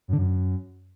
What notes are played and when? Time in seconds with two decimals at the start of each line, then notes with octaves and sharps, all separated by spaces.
0.08 F#2
0.13 D3
0.18 F#2